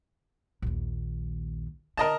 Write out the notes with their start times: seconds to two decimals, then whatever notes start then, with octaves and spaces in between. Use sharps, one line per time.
0.62 A#1 D#2
1.97 D3 A#4 D#5 A5